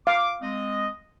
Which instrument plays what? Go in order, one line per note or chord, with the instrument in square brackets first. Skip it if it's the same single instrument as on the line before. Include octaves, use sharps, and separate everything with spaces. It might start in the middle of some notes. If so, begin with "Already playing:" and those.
[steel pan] F5 [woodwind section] D6
[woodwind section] G#3 C4 D#5